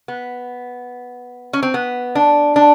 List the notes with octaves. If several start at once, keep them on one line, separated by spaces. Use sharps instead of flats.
B3
C#4
C4
B3
D4
D4